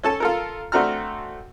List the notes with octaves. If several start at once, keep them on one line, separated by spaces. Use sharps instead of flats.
C#4 A4 A5
F4 A4 A#4
A3 C4 D4 F#4 A#5 F6